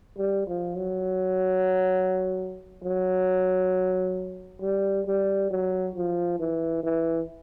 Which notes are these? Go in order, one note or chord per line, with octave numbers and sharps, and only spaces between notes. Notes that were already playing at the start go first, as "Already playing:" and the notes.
G3
F3
F#3
F#3
G3
G3
F#3
F3
E3
E3